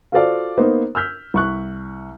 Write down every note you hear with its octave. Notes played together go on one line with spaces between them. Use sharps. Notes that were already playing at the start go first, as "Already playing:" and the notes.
F4 F#4 A4 C5 D5 F5
A#3 B3 D#4 C5
E6 F6 G6 B6
C2 C#6 F#6